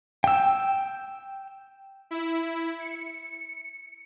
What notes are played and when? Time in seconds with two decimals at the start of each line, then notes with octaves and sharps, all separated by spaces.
0.24 G5 E6
2.11 E4
2.80 C#7